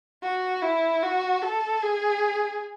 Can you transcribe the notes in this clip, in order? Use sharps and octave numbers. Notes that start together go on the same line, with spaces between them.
F#4
E4
F#4
A4
G#4